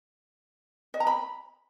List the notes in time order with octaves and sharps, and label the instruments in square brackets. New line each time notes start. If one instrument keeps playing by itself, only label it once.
[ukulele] D#5
A#5
B5